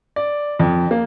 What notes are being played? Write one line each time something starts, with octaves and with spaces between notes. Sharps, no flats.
D5
F2
A#3